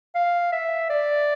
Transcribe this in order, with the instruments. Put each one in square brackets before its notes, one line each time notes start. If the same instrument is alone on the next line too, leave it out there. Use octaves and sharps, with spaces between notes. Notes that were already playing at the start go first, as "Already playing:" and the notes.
[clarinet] F5
E5
D5